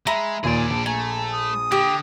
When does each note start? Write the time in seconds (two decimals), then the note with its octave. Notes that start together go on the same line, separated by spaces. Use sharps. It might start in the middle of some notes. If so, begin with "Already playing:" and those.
0.07 G#3 E5 A#5 B5
0.44 D#2 A#2 G#4 D5 G#5
0.70 A#1 A5
0.86 A3 G#5 A#5
1.32 D#6
1.72 D3 G4